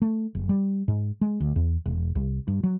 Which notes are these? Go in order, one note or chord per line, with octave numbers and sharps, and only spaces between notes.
A3
F#1
G3
G#2
G#3
D2
E2
E1
C2
G2
F#3